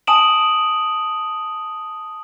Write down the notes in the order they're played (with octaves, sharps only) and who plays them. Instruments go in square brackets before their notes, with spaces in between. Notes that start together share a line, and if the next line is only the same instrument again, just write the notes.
[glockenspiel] G#5 A5 D#6 D7 E7 F#7